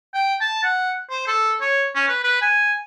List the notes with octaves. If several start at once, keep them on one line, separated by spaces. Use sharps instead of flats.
G5
A5
F#5
C5
A4
C#5
C#4
B4
B4
G#5